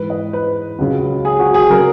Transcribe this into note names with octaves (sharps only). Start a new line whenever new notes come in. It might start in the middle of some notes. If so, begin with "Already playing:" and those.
Already playing: G#2 E3 B4
D#5
B4
C#2 C#3 F#3
G#4
F#4
G#4
C#3 F#3 A#4